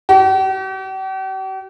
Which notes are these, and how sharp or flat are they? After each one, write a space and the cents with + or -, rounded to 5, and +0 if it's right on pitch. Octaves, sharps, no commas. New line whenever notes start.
G4 -45